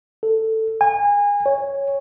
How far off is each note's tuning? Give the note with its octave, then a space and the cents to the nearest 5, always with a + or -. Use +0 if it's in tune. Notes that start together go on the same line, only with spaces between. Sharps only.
A4 +10
G#5 -30
C#5 -5